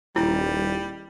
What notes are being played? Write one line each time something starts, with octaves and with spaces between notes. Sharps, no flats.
D#1 G3 E4